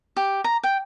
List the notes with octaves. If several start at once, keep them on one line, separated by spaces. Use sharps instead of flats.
G4
A#5
G5